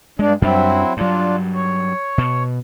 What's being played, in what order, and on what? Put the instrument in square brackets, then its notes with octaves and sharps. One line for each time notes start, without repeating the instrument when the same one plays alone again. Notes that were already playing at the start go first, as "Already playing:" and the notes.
[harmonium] G2 D4 [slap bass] G#3
[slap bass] F#2 G3 D4 [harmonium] F#3 C4 E4
[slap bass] G2 F#3 [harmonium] D4 F4
[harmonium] C#5
[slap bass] B2